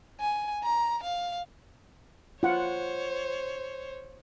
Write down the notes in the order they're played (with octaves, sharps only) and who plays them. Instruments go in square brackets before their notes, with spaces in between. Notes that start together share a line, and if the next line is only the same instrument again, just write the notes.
[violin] G#5
A#5
F5
[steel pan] F4 F#5 [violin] C5 C#5